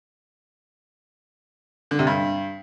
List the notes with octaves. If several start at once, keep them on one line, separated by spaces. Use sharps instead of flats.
D3
C3
G2